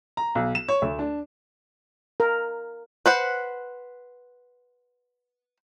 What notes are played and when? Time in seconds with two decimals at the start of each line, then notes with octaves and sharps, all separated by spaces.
0.17 A#5
0.35 B1
0.55 E7
0.68 C#5
0.82 D2
0.99 D4
2.20 A#4
3.06 B4 C5 F#5